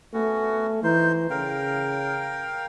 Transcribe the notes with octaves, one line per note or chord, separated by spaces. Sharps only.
A3 B3 C#4 F#4
E3 D#4 C5 C6
C#3 A#4 F5 G5